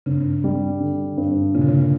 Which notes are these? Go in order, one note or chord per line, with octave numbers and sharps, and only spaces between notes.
G2 C#3
G3
D3
G2
A#2 C#3
D3
C#3